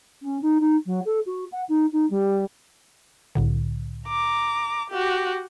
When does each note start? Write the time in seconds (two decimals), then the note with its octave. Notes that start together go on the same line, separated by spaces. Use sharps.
0.22 C#4
0.42 D#4
0.60 D#4
0.86 F#3
1.05 A4
1.26 F#4
1.52 F#5
1.68 D#4
1.92 D#4
2.10 G3
3.35 C2 A2 D3
4.08 A#5 D6
4.90 F#4 G4